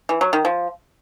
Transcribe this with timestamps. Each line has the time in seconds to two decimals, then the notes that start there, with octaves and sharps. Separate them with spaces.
0.09 E3
0.21 F#3
0.33 D#3
0.45 F3